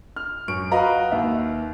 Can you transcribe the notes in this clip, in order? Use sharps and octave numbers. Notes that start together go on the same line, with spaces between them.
F6
F#2 C#6 D7
F#4 B4 D#5 F5 A#5 B5
D#2 E5